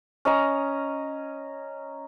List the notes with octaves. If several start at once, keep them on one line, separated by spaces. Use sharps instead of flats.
C#4 D#5 A#5